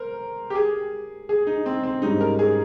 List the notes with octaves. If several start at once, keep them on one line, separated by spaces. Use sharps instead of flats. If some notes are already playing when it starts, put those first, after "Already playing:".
Already playing: A#4 C5
G4
G#4
G#4
D#4
C4
C4
G#2 G3 C#4 D#4
A#4
G#4